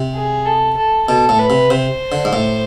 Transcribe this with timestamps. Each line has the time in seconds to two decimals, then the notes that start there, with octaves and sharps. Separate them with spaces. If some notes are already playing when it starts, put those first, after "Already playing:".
Already playing: C3
0.15 G#4
0.46 A4
0.77 A4
1.08 B2 A4
1.29 A2
1.39 B4
1.50 C3
1.70 C3 C5
2.12 D3
2.25 G#2
2.33 A2